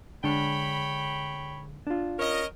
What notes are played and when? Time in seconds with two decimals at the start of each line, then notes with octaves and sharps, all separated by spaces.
0.24 D3 G#3 D4 C#5 G5 B5
1.87 D4 F4
2.19 C#4 A#4 D#5